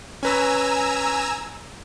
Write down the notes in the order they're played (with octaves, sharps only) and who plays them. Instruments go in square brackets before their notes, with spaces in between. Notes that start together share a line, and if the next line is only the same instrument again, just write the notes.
[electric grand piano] C#4 B4 [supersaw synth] G#5 A#5 E6